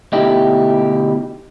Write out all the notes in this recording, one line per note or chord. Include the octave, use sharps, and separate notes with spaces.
D2 B2 D3 D#4 E4 G4